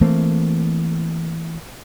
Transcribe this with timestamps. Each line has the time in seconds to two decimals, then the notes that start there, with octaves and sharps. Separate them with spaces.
0.01 E3 A3 A#3 C4